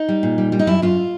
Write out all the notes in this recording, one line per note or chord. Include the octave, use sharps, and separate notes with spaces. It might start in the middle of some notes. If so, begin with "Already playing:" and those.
Already playing: D#4
G3
A#2
G3
G3
D#4
F#2 E4
F#2 F4